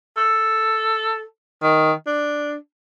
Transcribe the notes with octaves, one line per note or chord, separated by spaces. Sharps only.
A4
D#3
D4